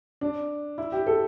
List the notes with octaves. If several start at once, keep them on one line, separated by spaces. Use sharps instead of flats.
D4
E4
G4
A4